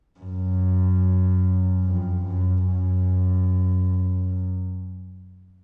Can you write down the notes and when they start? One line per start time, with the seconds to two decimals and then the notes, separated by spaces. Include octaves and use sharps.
0.20 F#2
1.85 F2
2.26 F#2
2.67 F#2